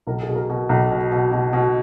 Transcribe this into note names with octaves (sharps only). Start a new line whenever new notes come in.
B1 A#4
G#4
B2
A#4
B2
B1
B2
B2
B2
B2